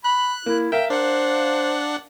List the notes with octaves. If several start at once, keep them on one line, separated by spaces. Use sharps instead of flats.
B5 F#6
A#3 E4
A#4 E5 F5 G5
D4 C5 F#5